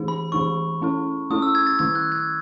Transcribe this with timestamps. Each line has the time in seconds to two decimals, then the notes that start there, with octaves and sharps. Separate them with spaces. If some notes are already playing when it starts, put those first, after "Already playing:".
Already playing: E3 A3 D#4 G#4
0.08 B5
0.32 E3 A3 D#4 G#4 C#6
0.82 A3 C#4 E4 A4
1.30 A3 C#4 E4 A4 D#6
1.42 E6
1.55 G#6
1.67 A6
1.79 D#3 A3 E4 G#6
1.95 F#6
2.12 G#6